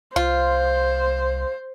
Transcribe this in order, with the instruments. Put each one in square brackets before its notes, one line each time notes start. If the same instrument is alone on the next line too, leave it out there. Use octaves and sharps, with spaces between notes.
[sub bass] C2 [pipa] F4 [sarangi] C5